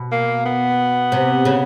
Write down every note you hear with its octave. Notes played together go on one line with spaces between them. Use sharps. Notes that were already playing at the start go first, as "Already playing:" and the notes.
Already playing: B2
A#3
B3
C3
C#3